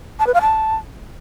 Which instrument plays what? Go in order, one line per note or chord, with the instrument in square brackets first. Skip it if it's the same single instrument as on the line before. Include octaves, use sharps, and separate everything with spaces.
[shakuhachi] A5
B4
F5
A5